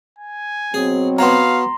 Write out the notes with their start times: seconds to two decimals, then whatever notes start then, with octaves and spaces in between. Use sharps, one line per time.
0.18 G#5
0.74 B2 F#3 C4 G#4
1.19 B3 F#4 C#5 F5 A#5 C6